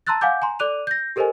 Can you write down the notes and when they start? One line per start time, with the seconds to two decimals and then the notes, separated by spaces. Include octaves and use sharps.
0.07 A5 A#5 C6 E6 F#6 A6
0.21 F5 F#5 G#5 D6 G6
0.42 G#5 A#5 C6
0.59 A4 D5 D6 F#6 D#7 F7
0.87 G6 A#6
1.16 G4 A4 A#4 C5 D#5 G#5